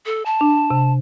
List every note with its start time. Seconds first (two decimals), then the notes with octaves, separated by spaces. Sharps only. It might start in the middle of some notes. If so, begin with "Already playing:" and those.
0.06 A4
0.25 A5
0.41 D4
0.70 C3